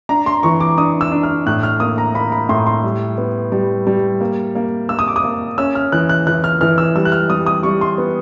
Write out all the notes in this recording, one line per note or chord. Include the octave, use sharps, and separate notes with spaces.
D4 A#5
C6
E3 C#6
D6
D4 D#6
E6
D4
F6
A2 F#6
F6
A#3 D#6
A#5
A#3 B5
B5
A2 C6
C6
G3
B3
G3
G3
A#3
A#3
A#3 E6
D#6
D6
D#6
A#3
C#4 E6
F6
E3 F#6
F#6
E3 F#6
F6
E3 F6
E6
G3 E6
F#6
F6
G3 D#6
D#6
G3 C#6
C6
B3